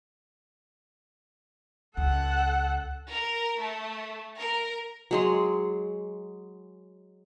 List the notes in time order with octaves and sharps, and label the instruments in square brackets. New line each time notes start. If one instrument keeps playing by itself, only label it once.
[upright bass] C#2 [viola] A4 F#5
[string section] A#4
A3
A#4
[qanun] F#3 G#3 C6